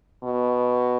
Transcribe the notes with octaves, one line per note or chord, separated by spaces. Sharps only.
B2